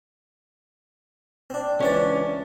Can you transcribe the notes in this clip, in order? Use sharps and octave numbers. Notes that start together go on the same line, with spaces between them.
C4 D4
C#2 E3 C#4 D4 D5